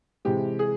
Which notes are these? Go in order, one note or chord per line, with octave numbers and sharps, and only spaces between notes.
C3 E3 G#3 G4
G#4